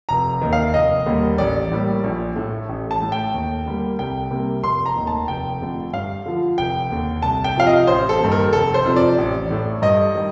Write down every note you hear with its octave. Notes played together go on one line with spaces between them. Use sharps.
F1 A#5
D#2 D#3
F5
F1 D#5
D#2 D3 G3 A#3
A1 D5
A2 G3 A#3
A#1
A2 A3
A1
A5
A2 A3
G5
D#2
D3 G3 A#3
C2 G5
C3 G3 A#3
F1 C6
A#5
D#2 D#3 A3
A5
F1 G5
F2 D3 A3
G2 F5
D3 F3
F1 G5
D#2 D3
C2 A5
G5
C3 F3 F5
D#5
A1 C5
A4
G2 D#3 A#3
A#4
F1 A4
C5
F2 C3 F3
D5
A1
A2 A3
G2 D#5
D#3 G3